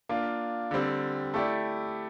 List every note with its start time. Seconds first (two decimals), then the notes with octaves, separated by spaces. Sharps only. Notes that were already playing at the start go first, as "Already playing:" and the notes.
0.09 A#3 D4 F4
0.71 D3 G3 C4
1.34 A3 E4 G4 D5